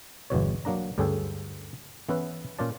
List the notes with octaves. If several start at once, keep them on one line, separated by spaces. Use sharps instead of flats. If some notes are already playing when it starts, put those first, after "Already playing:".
G1 E2 B2 C#5
F#3 A#3 D4 A#5
D2 G2 C#4 G#4 A4 G5
E3 B3 C#4 E4 B4
A#2 C#4 F4 D5 A5